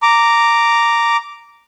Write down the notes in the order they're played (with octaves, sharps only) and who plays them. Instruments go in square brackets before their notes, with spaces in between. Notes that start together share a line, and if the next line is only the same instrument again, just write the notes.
[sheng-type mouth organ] A#5 D6